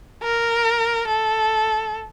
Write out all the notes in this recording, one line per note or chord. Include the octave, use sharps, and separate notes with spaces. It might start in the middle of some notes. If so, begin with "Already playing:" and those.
A#4
A4